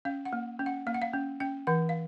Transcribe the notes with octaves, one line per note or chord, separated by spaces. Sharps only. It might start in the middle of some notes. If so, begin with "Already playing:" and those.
C#4 F5
F#5
A#3
C#4
F#5
A#3 F5
F#5
F5
C#4
C#4 G5
E3 F#5
F5